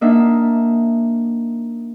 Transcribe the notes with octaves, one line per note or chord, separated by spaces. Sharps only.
A#3 D4 D#4 E5 F#5